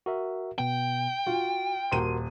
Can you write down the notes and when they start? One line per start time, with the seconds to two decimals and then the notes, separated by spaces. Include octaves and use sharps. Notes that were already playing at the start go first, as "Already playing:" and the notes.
0.06 F#4 A#4 E5
0.58 B2 B3 G5
1.27 F4 F#4
1.92 D#1 F#4 A#4 C6 D#7